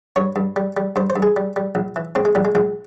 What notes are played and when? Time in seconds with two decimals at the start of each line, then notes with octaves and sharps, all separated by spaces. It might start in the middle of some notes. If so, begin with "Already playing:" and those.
0.16 G2 C#5
0.36 G2
0.56 G3
0.77 G3
0.96 G2 C5
1.10 C5
1.16 G2
1.22 G#4
1.36 G3
1.56 G3
1.75 A#1
1.96 E3
2.15 G#2 C4
2.25 G#3
2.35 A#1 G3
2.45 G#3
2.55 A#1 G#3